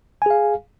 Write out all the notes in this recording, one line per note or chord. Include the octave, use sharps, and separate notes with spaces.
G#4 F5 G#5